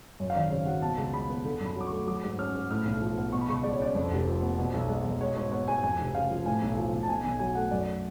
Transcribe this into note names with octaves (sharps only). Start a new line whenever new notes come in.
F#2 C#5
F5
G#1 D5
C#3 C#5
F#3 F#5
B2 A5
C#2
G#3 B5
B3
D3
F#2
B5
F#3 D6
A3 C#6
F#3 D6
G#2
C#4 F6
G#2
A2 F6
B1
F3
B3
B2 C#6
B5
C#2 C#6
G#3 D5
C#5
C#4 D5
F2
F1
F3
B3
B2
B1
G#3
B1
G#3 C#5
G#2 C#5
B3 C#5
G#2 G#5
F2 G#5
F1
C#3 F5
F3
A2 G#5
B1
F3
B1
A5
B2 G#5
B1 G#5
F#3 G#5
A3 F#5
F#2 D5